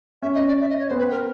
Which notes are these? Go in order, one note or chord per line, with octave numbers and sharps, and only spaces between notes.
C#4 E5
D#5
C#4
D5
E5
D#5
C#5
B3 C5
C4 B4
A#4